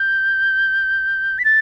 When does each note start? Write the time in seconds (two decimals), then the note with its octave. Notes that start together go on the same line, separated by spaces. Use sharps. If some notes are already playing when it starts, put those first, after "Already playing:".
Already playing: G6
1.39 B6
1.45 A6